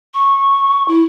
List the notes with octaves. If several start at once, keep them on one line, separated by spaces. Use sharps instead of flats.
C#6
E4